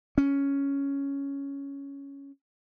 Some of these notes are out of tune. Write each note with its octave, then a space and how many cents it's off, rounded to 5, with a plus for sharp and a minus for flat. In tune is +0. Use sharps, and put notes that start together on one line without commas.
C#4 +5